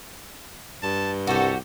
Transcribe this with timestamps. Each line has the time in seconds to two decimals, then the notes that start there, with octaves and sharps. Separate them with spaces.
0.83 G2 A5
1.27 C2 F#4 G4 A4